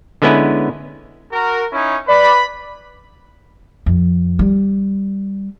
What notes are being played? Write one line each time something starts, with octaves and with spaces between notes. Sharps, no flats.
D3 G#3 B3 C#4 E4 B4
F#4 A#4
C#4 D#4 E4
B4 D5 B5
F2
G3